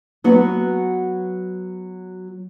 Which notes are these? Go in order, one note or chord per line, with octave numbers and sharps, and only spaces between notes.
F#3 B3 F#4